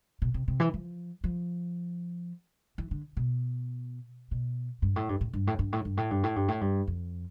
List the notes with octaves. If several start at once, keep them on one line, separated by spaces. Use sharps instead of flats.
B2
C3
C3
E3
F3
F3
E3
D3
B2
B2
G2
A2
G2
A2
G2
A2
G2
A2
G2
A2
G2
A2
G2
A2
G2
F2